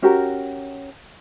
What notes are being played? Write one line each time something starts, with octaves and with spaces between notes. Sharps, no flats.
C#4 F#4 G4 A#4